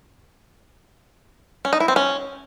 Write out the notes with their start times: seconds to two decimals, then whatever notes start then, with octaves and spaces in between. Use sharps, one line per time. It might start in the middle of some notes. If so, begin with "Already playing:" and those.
1.65 C#4
1.73 D#4
1.80 E4
1.88 C4
1.96 C#4